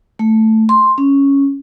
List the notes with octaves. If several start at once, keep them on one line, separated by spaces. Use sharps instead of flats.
A3
C6
C#4